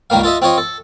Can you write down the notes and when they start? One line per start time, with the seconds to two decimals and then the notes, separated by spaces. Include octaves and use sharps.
0.10 C#2 D#3 G3 A#3 F5
0.23 F4 A4 D#5 E5
0.42 C4 F4 C#5 D#5
0.58 A4